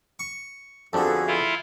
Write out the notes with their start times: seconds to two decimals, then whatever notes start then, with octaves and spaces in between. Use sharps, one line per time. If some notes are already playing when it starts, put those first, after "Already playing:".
0.19 C#6
0.93 F2 D3 B3 C4 D4 F#4 G#4 A4
1.27 E4 F4